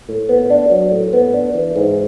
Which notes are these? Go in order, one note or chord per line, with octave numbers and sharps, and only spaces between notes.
A2
B3
D4
F#3
A2
B3
D4
E3
G#2